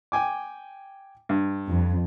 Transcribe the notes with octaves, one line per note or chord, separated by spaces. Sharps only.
G5 G#5 D6
G2
F2